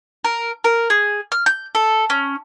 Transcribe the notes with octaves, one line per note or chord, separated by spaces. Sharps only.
A#4
A#4
G#4
F6
G6
A4
C#4